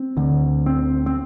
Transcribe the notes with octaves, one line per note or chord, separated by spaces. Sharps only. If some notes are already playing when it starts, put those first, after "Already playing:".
Already playing: C4
D2 D3
C4
C4